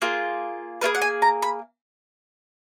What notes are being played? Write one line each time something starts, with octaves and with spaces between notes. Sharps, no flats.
A#3 F4 G#4
A#3 F4 G#4 B4
F#5
G#5
A#5
B5